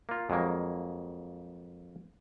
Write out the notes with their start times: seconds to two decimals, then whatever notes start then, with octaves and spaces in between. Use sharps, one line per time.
0.09 A#3 F4
0.30 F2 F#3 G#3 A#3